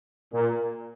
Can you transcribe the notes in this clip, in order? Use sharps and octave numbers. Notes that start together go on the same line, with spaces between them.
A#2